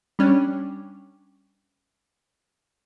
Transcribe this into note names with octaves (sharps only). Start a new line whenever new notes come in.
G3 C#4 D4